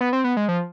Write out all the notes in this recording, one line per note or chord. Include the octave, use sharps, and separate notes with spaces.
B3
C4
B3
G#3
F3